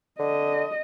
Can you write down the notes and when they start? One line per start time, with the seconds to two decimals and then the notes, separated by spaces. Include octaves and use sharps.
0.19 D3 D#5